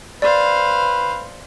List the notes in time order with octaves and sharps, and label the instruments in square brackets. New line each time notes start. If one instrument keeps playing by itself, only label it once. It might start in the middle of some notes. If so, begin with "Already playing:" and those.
[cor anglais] B4 [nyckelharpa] C5 F5 [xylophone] D5